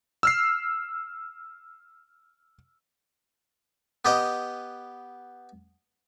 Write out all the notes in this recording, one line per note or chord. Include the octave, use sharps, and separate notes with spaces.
E6 F6 C7
B3 G4 D#5